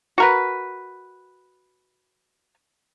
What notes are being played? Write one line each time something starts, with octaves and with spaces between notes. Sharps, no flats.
F#4 A#4 B4